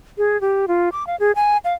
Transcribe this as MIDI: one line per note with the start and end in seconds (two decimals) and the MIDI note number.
0.18 0.40 68
0.41 0.66 67
0.68 0.89 65
0.92 1.06 86
1.07 1.16 77
1.20 1.32 68
1.36 1.57 80
1.65 1.74 77